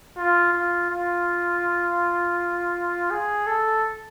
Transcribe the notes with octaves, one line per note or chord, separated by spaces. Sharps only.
F4
F4
F4
G#4
A4